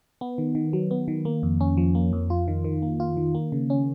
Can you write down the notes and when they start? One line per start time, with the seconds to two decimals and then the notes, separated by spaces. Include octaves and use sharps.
0.21 B3
0.38 D#3
0.55 D#3
0.73 F#3
0.91 B3
1.08 D#3
1.25 A#3
1.43 F2
1.61 C#4
1.77 F3
1.95 A#3
2.13 F2
2.30 F4
2.48 D#3
2.64 D#3
2.82 A#3
3.00 F4
3.17 D#3
3.35 A#3
3.52 C#3
3.70 C#4